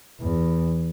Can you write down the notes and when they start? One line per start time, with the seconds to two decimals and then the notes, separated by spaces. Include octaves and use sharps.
0.20 E2